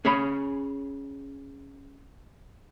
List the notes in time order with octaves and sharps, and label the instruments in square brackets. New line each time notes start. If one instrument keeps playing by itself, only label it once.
[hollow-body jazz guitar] C#4 G#4 C#5 B5